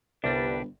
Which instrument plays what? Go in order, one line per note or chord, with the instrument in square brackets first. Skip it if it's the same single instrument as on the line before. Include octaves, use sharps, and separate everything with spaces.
[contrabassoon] G1 [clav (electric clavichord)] C2 [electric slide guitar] G3 D4 [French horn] B4